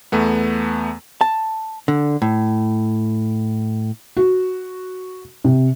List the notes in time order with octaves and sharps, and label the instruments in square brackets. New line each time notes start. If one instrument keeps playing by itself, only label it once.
[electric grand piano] E2 A3 B3
[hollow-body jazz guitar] A5
D3
A2
[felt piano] F#4
C3